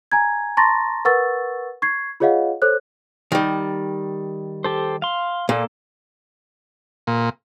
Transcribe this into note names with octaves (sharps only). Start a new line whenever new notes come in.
G#5 A#5 G#6
A5 A#5 C6 C#6 A6 A#6
A#4 B4 F#5 C#6 E6 A6
C#6 G#6 C7
F4 G#4 C#5 D#5 F5 F#5
A4 C5 C#5 F#6
D#3 G3
G4 A4 C5
F5 C6
A#2 A#3 A4
A#2